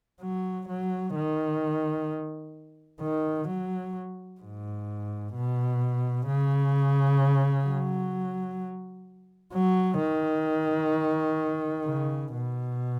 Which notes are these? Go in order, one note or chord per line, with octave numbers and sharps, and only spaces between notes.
F#3
F#3
D#3
D#3
F#3
G#2
B2
C#3
F#3
F#3
D#3
C#3
B2